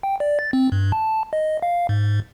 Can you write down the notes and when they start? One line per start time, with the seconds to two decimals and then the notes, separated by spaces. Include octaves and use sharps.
0.03 G5
0.20 D5
0.39 A6
0.53 C4
0.72 G2
0.92 A5
1.33 D#5
1.62 F5
1.89 G#2